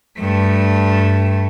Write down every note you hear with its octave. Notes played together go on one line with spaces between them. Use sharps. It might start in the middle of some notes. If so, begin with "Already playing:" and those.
G2 A3